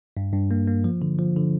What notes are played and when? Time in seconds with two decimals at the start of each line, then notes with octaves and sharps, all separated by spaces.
0.17 G2
0.33 G2
0.51 A#3
0.68 A#3
0.84 F3
1.02 D3
1.19 F3
1.36 D3